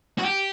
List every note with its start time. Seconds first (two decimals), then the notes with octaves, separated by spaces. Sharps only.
0.19 F#4
0.25 G4